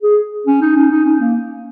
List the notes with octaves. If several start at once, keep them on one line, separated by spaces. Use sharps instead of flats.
G#4
C#4
D#4
C#4
D#4
C#4
A#3